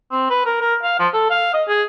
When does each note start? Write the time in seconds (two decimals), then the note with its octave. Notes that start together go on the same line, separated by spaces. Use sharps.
0.11 C4
0.30 B4
0.46 A#4
0.61 A#4
0.83 F5
0.99 F3
1.14 A4
1.30 F5
1.54 D#5
1.68 G#4